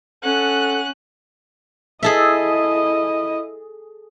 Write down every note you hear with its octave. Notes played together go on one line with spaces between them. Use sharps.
C#4 A4 F#5 F#6
E4 G#4 A4 D#5 E5